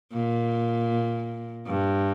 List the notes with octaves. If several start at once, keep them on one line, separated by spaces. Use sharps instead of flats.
A#2
G2